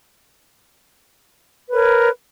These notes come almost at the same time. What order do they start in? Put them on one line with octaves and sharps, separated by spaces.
B4 C#5 A#4